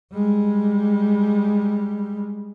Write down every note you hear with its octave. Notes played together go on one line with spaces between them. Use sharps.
G3 G#3